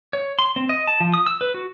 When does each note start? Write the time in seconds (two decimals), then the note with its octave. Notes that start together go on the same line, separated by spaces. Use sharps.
0.13 C#5
0.39 C6
0.56 C4
0.69 D#5
0.87 A5
1.00 F3
1.14 D#6
1.26 E6
1.41 B4
1.54 F#4